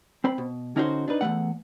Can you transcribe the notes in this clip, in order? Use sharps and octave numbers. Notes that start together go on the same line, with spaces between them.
C4 C5 B5
B2
D3 C#4 D#4 E4 F#4 C5
D4 D#4 B4
E2 G2 A3 F#5